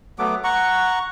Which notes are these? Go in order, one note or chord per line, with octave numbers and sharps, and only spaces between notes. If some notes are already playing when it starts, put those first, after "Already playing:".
F#3 A3 B3 D6
F#5 A#5 C#6